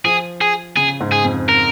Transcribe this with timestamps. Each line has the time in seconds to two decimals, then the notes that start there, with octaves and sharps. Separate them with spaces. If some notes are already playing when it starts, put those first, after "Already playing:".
0.05 F3 G#4
0.41 G#4
0.76 C#3 G#4
1.00 G#2
1.12 G#4
1.25 F2
1.49 A#4